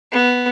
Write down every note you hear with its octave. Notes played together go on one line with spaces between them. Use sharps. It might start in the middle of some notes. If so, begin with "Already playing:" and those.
B3